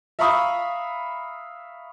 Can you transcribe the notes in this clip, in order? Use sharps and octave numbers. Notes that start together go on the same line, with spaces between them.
E5 F5 A#5 B5 C#6 D#6